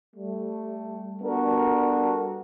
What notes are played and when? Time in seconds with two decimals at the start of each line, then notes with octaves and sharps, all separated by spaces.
0.16 G3 A3
1.22 G3 B3 D4 F#4 A4 A#4